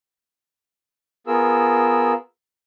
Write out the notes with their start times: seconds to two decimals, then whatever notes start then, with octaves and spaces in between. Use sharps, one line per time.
1.27 B3 F4 G#4 A#4 E6